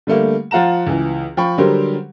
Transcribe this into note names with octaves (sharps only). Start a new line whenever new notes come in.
D3 G3 A3 A#3
F3 F4 F#5 A#5 E7
C#2 E3
F3 G5 B5 C#6
D3 F#3 G3 G4 A#4 C5